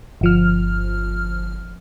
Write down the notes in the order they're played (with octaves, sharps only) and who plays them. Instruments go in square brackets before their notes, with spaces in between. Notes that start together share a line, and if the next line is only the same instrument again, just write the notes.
[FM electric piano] G1 F3 F6